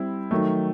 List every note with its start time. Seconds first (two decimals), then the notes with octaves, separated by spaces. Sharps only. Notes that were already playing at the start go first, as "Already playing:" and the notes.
Already playing: G3 C4 E4
0.31 D#3 F#3 A3